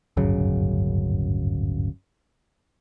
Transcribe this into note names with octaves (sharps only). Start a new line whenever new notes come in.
D1 G1 F#2 C#3